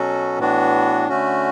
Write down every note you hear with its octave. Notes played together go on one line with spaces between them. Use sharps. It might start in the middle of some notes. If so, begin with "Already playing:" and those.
Already playing: B2 F#3 C#4 F#4 A4
A2 E3 B3 D4 F#4
D3 A3 C#4 F#4